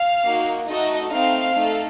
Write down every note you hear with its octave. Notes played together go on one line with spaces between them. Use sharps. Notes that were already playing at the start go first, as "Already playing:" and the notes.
Already playing: F5
A#3 D#4 F#4
A3 D#4 F#4 A4 D#5
A3 C4 D#4 F5
A3 D#4 A4